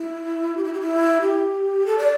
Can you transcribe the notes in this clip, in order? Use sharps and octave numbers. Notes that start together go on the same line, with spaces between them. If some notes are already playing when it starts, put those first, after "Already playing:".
Already playing: E4
G4
E4
G4
E4
G4
A4
D5